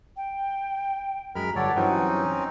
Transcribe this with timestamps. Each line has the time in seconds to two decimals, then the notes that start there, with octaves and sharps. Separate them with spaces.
0.16 G5
1.35 F#2 G#3 A#4 B5 F6
1.56 G1 A4 C#5 D5 F#5
1.76 G2 E3 F#3 C4 C#4 D#4
2.23 A#5